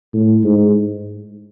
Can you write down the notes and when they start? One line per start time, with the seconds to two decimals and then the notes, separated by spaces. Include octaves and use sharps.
0.13 A2
0.44 G#2